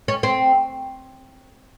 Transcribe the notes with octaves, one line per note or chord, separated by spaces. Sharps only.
C#4
C4